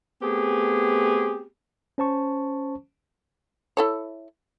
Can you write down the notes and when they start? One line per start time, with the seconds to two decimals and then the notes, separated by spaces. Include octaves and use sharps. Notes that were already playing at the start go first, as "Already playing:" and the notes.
0.22 A3 B3 C4 G4 G#4
1.98 C#4 C5 A5 C#6
3.77 E4 A4 C#5